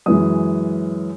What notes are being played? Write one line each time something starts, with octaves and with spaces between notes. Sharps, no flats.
F#2 E3 G#3 D#6